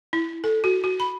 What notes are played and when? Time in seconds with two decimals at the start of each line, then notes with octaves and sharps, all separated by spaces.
0.13 E4
0.44 A4
0.64 F#4
0.84 F#4
1.00 B5